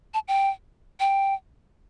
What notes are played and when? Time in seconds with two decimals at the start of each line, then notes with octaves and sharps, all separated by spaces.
0.14 A5
0.28 G5
1.00 G5